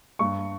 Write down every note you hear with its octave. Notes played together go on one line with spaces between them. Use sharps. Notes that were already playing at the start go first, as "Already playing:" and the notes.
G2 C#6